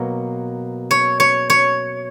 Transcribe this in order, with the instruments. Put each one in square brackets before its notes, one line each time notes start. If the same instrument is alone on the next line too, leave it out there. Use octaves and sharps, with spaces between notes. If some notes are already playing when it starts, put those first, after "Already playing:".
Already playing: [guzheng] B2 F#3 A#3
C#5
C#5
C#5